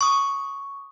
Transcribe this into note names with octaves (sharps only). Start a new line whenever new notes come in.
C#6 D#6